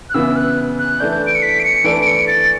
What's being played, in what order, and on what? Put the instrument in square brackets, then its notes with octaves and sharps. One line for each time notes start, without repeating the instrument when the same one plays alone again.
[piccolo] F#6
[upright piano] C#3 E3 B3 E4 [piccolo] E6
[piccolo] F#6
F#6
[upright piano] E3 A3 D4 [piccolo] G6
[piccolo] D7
C#7
B6
D7
C#7
[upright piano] E3 A3 D4 [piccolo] D7
[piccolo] D7
C#7
A6